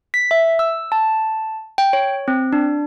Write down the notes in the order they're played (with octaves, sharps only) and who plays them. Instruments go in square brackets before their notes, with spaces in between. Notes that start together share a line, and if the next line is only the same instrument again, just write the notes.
[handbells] B6
E5
E6
A5
G5
C#5
C4
D4